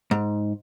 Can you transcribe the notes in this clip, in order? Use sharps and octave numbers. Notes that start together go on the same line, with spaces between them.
G#2